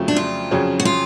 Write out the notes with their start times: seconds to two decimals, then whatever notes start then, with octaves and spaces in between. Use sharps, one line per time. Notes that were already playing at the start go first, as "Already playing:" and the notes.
Already playing: F2 C#3 F#3 A3
0.08 D4
0.17 F4
0.51 F2 C#3 F#3 C#4 G#4
0.80 F#4
0.85 F4